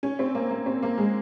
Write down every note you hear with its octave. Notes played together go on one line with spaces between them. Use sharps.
C#4
C4
A#3
A#3
C4
A#3
G#3